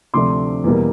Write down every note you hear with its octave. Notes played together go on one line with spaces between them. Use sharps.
D2 C3 F3 A3 D4 C6 D6
E2 B2 G3 A#3